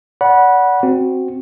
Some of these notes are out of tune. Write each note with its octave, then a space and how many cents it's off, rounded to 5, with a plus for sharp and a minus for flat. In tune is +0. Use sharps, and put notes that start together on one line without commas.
D5 -35 F#5 +0 B5 -25
C4 +0 F#4 +0